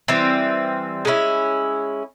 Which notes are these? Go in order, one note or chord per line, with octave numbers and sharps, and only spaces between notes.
E3 G3 C4
G#3 C#4 E4